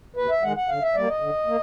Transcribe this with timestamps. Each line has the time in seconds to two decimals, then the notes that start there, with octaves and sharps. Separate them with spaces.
0.16 D#2 B4
0.30 E5
0.43 D#3 G#3 F#5
0.56 F#5
0.69 D3 F5
0.82 E5
0.95 G3 A#3 D5
1.08 D#5
1.20 D3
1.47 A#3